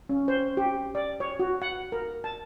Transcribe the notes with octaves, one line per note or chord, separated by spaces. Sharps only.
C#4
C5
G4
D5
C#5
F#4
F#5
A#4
A5